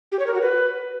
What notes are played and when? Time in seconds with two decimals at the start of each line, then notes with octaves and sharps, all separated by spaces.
0.12 G4
0.19 C#5
0.26 A#4
0.34 F#4
0.41 B4